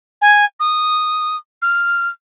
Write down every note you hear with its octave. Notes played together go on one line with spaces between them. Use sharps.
G#5
D#6
F6